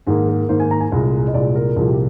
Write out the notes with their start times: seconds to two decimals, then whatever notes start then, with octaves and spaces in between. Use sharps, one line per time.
0.07 G#2 D#3 A#3 G#4
0.28 A#4
0.49 G#2 D#3 A#3 C5
0.60 G#5
0.71 A#5
0.81 G#5
0.91 C2 A#2 G#3
1.28 D#5
1.34 C2 A#2 G#3 D5
1.55 A#4
1.77 C2 A#2 F3 A#3 G#4
1.87 G4